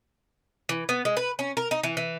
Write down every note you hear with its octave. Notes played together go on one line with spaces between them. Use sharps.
E3
B3
G#3
B4
C#4
A#4
D#4
E3
E3